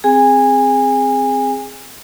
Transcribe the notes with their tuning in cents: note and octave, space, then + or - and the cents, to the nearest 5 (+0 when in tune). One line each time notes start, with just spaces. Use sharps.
C4 +0 G#4 +0 G#5 -25